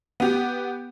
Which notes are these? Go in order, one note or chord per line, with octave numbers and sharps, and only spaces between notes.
B3 G4